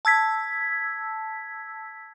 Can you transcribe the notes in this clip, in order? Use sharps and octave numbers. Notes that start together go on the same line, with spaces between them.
A5 E6 G#6 B6